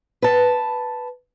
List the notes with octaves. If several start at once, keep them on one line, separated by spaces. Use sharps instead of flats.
B4 A5